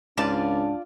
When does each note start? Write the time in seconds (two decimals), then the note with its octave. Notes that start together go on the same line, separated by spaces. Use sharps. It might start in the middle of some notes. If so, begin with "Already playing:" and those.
0.17 C#2 G#2 D4 F4 D5 F5 A5